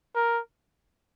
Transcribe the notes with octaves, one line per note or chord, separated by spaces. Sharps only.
A#4